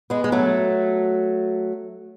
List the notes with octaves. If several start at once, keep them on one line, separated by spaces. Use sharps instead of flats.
G#3 B3
G#3
F#3 A3